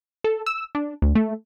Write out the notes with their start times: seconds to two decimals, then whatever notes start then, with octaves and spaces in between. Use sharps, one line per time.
0.24 A4
0.46 E6
0.75 D4
1.02 D2
1.15 A3